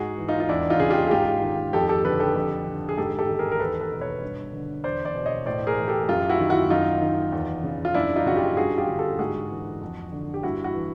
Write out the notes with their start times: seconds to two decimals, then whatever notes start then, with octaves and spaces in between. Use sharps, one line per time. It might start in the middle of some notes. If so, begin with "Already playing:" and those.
Already playing: G#2 F#4 G#4
0.18 E3
0.28 D#4 F4
0.40 F4
0.49 E2 D4 E4
0.70 D#4 F4
0.80 C#3 G#4
0.90 F4 G4
1.07 G#4
1.11 G#2 F4 G4
1.42 D#3
1.73 F2 G4 A4
1.89 G4 A4
2.05 D3 A4 B4
2.20 G4 A4
2.35 F2
2.67 D3
2.89 G#4
2.97 G#2 G4 A4
3.19 G4 A4
3.29 D#3
3.39 G#4 A#4
3.51 A#4
3.60 E2 A4 B4
3.81 A4 B4
3.91 B2
4.01 B4 C#5
4.22 G2
4.53 D3
4.84 E2 C5 D5
5.05 C5 D5
5.15 B2
5.26 C#5 D#5
5.46 A2 C5 D5
5.67 G#4 A#4
5.77 E3
5.88 G4 A4
6.09 F#2 F4 G4
6.29 E4 F#4
6.39 D#3
6.50 E4 F#4
6.70 F#2 D#4 F4
7.02 D#3
7.32 E2
7.64 C#3
7.85 F4
7.94 F#2 D4 E4
8.16 D#4 F4
8.26 C#3 F#4
8.36 F4 G4
8.57 G2 F#4 G#4
8.78 F4 G4
8.88 D3
8.99 G4 A4
9.19 G#2 F#4 G#4
9.50 E3
9.81 F2
10.12 D3
10.34 G4
10.43 G2 E4 F#4
10.64 E4 F#4
10.75 E3